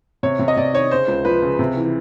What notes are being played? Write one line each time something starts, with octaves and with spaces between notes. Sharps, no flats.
C3 C#5
C3
D#5
C3 D5
D#3 C#5
C#3 C5
C#2
F3 B4
C#3
C3
E3